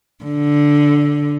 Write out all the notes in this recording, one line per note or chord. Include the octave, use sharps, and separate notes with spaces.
D3